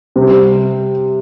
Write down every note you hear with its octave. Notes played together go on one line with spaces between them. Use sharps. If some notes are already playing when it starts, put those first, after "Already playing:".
C3 G3 C4